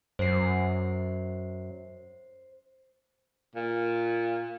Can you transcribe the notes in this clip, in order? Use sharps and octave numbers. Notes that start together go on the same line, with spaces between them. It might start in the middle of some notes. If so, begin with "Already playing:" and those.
F#2 C5 C7
A#2